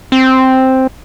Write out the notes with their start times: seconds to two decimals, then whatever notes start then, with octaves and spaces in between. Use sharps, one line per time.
0.12 C4